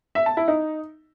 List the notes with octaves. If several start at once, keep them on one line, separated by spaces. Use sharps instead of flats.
E5
A5
E4
D#4